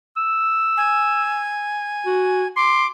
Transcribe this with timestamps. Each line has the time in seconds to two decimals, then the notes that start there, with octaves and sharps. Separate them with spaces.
0.17 E6
0.77 G#5
2.06 F#4
2.56 C6 D6